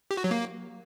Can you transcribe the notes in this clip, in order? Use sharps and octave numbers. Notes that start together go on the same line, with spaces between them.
G4
F#4
F#3
A#3